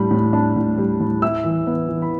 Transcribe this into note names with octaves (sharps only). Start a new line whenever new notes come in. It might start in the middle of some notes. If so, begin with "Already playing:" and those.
Already playing: A2 G3 D4 B5
A2
D4
A2
G3
A2
E4 E6
E3
B3
E3
B5